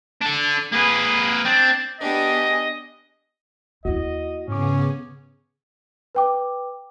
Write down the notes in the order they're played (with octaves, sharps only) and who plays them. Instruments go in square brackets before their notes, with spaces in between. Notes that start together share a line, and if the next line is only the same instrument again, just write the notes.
[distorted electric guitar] D4 A4
[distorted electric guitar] A#3 B4 [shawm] G#4
[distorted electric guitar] C4 [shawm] D4
[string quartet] B3 G4 G#4 [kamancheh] D4 [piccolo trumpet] D#5
[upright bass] D#2 E4 [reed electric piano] F#4 [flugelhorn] D#5
[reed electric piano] G#2 D6 [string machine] C#3 B3 G#4 [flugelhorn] C#4
[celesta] B4 G5 D6